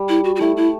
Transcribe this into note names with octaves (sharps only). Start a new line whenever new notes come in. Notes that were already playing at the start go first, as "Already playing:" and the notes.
Already playing: G3
E4
F#4
F#4
A3 E4
E4